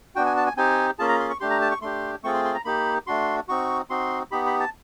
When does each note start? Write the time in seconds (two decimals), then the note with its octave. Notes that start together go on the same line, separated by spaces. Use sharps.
0.16 B3 D4 F#4 G5
0.26 G#5
0.37 A5
0.46 G#5
0.57 C4 D#4 G4 G#5
0.99 A#3 C#4 F4 G#4 A5
1.09 A#5
1.20 C6
1.30 C#6
1.40 A3 D4 G4 C6
1.50 A#5
1.61 A5
1.71 C#6
1.82 A3 D4 G4 C6
2.23 A3 C4 F4 G#4 C#6
2.34 C6
2.45 C6
2.54 A#5
2.65 A#3 D#4 G4 B5
3.07 A3 D4 F#4 C6
3.48 C4 D#4 F#4 C#6
3.90 C4 D#4 F#4 C6
4.31 B3 D#4 G4 B5
4.46 B5
4.60 A5